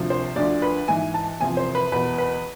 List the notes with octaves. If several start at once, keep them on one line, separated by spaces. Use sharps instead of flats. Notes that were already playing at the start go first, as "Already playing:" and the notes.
Already playing: D2 C3 F3
C5
D2 D3 F3 D5
B4
G#2 E3 G#5
A5
E2 C3 F3 G#5
C5
B4
E2 B2 B4
B4